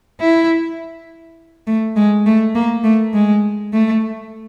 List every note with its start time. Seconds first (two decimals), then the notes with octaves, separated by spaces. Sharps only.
0.20 E4
1.67 A3
1.96 G#3
2.26 A3
2.55 A#3
2.84 A3
3.14 G#3
3.73 A3